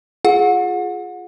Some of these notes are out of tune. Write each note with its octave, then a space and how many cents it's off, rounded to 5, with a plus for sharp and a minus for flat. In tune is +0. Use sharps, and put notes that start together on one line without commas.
F4 +0 G#4 +5 F#5 -30